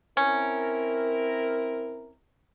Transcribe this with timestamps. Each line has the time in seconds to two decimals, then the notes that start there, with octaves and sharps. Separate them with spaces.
0.17 C4 C#4 E4 A#4